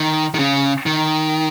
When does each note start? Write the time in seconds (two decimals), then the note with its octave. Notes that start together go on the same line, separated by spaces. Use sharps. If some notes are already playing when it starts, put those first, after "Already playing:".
Already playing: D#3
0.35 D#3
0.39 C#3
0.86 D#3